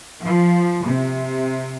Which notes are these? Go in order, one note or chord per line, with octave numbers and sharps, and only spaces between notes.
F3
C3